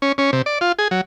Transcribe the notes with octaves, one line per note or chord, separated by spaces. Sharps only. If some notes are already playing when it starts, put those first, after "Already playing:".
C#4
C#4
C3
D5
F4
G#4
F#3